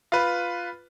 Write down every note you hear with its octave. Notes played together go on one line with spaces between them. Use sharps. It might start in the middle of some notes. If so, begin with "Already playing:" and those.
F4 B4